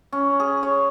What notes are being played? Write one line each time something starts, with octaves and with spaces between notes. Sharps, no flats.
C#4
G#4
C#5